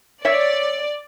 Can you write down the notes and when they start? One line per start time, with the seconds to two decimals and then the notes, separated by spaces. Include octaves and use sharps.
0.25 C#5 D5 E5